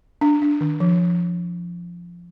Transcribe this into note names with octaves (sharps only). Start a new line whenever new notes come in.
D4
D4
D#3
F3